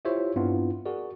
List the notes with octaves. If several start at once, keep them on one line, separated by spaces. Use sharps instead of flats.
E4 F4 G4 C5 C#5 E5
G2 B3 C4 D4 E4 F4
F#4 G#4 A#4 D5